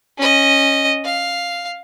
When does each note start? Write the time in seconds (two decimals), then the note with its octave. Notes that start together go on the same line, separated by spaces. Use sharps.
0.18 C#4 D#5
1.04 F5